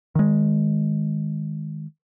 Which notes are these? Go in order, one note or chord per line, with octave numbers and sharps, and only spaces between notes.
D#3 G#3